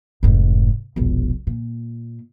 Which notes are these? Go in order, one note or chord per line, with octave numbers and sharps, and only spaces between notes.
F1 G#2
E1 A#1
A#2